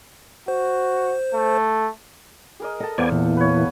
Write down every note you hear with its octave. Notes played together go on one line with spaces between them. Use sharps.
F#4 C5
A3
G#4 A#4 D#5
A4 D#5 A5
E2 B3 C5 D5 F5 F#5 G#5
A#2 E3
B4 C#5